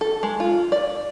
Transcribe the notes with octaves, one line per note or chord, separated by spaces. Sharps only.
A4
G#3
F4
D5